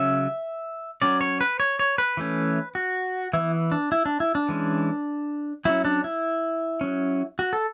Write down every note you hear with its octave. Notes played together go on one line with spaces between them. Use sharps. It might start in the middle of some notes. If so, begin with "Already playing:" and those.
Already playing: C#3 F#3 C#4 E5
F#3 C#4 D5
C#5
B4
C#5
C#5
B4
E3 A3 C#4
F#4
E3 B3 E4
D4
E4
D4
E4
D4
E3 G#3 C#4
F#3 C#4 E4
D4
E4
F#3 C#4
F#4
A4